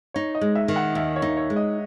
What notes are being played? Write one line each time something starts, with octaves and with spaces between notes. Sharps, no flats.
D#4 C#5
D#5
G#3
E5
D#3
F#5
D#2 E5
C#5
D#4
C#5
G#3
D#5